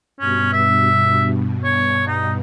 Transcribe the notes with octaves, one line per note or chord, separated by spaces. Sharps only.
G2 B2 C#4
E5
C#5
D#4